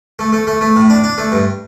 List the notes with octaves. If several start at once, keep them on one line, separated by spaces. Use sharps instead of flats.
A3
A3
A3
A3
A2
D4
D4
A3
G2